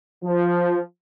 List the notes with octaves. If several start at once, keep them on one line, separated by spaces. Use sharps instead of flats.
F3